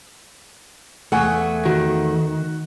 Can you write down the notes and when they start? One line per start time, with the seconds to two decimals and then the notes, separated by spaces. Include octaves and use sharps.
1.12 E2 A3 F#5 G#5 C#6
1.65 D#3 F#4